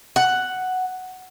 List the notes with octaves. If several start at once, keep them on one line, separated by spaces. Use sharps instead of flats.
F#5